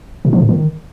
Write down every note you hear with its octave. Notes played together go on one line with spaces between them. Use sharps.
B2
F3
A2
D#3